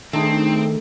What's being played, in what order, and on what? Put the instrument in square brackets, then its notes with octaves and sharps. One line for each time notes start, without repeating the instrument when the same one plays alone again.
[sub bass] D#3 [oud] A3 [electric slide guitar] C4 [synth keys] D4 D#4 G#4